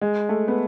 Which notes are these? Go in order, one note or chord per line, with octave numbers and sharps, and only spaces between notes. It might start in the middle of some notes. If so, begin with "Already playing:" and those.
G#3
A3
B3